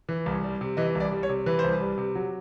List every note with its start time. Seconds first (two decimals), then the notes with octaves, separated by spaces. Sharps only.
0.09 E3
0.26 C2
0.43 G3
0.61 C3
0.77 E3 D#5
0.95 C2
1.00 D5
1.12 G3
1.23 C#5
1.29 C3
1.46 E3 B4
1.59 C5
1.64 C2
1.73 B4
1.81 G3
1.98 C3
2.15 F#3